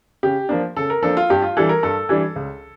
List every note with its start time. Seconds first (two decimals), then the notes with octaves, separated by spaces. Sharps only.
0.23 C#3 G4
0.49 F3 A#3 D4
0.76 C#3 A4
0.90 A#4
1.02 F3 A#3 D4 A4
1.17 F4
1.30 G2 G4
1.42 F4
1.57 E3 G3 D4 A4
1.69 A#4
1.83 G2 A4
2.09 E3 G3 D4
2.36 C#2